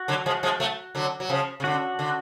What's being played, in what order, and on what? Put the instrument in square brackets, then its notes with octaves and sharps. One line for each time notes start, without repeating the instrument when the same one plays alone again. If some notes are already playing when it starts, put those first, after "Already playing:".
Already playing: [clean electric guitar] F#4
[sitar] D3 F#3
F3 G#3
F3 G#3
F#3 A3
D3 F#3
F#3
C#3 F3
C#3
[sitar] D3 [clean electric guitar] F#4
[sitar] D3